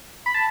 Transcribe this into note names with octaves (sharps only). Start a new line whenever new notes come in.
B5
A5